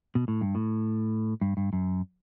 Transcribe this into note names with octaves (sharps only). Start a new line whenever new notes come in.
B2
A2
G2
A2
G2
G2
F#2